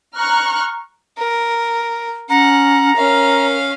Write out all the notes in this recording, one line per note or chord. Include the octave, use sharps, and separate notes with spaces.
A#5 C#6 F6 F#6
A#4
C#4 F#5 A#5
C#4 A#4 F5